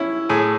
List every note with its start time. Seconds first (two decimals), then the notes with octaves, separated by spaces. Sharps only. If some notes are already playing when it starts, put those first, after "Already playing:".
Already playing: C#4 E4
0.29 A2 G#4 G#5